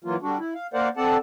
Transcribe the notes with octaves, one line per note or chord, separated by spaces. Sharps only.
E3 F#3 A#3 F4
D3 G3 D4 F#4
E4
F5
A#3 A#4 C5 D5 F5 F#5
C4 A4 D5 F#5 A5